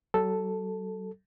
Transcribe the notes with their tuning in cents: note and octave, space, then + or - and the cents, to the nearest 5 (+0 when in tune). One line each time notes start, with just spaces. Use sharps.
F#3 +40 A4 +0